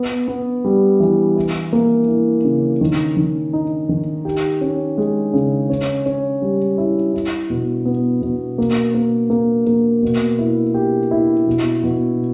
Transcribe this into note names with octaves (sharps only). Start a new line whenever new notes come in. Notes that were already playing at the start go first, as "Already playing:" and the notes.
Already playing: B3
B3
G3
E3
E4
A#3
E4
C#3
D#3
D#3
D#4
D#3
G4
C#4
G#3
C#3
C#4
C#4
G3
E4
E4
B2
B3
B2
A#3
A#3
A#3
A#3
B2
E4
G4
E4
B2
B2